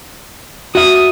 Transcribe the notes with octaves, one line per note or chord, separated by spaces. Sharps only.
F#4 E5 D#6